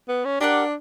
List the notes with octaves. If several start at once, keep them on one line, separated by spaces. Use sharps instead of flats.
B3
C#4
D4 G4 A#4 D5 F#5